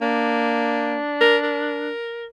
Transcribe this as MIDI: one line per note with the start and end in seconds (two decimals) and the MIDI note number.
0.02 1.00 58
0.02 1.91 62
1.21 1.37 70
1.43 2.26 70